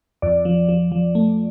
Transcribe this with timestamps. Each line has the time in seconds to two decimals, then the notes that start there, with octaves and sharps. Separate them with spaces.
0.22 F2 D5
0.45 F3
0.69 F3
0.92 F3
1.15 A3